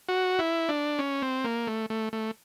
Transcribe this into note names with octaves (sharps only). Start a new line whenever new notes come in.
F#4
E4
D4
C#4
C4
A#3
A3
A3
A3